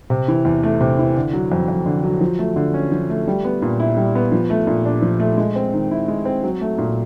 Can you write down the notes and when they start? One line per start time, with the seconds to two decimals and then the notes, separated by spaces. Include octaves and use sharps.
0.10 C3
0.28 E3
0.45 E2
0.63 A3
0.81 C3
0.99 E3
1.16 D3
1.33 F#3
1.52 F2
1.68 F2
1.86 D3
2.04 F#3
2.21 F3
2.39 A3
2.56 D3
2.74 C#4
2.92 F3
3.10 A3
3.28 G3
3.44 B3
3.62 A#2
3.80 E4
3.97 G3
4.15 B3
4.32 F3
4.50 A3
4.67 A#2
4.86 D4
5.02 F3
5.20 A3
5.37 G#3
5.56 C4
5.73 D#3
5.91 E4
6.08 G#3
6.25 C4
6.43 F#3
6.61 A3
6.78 A#2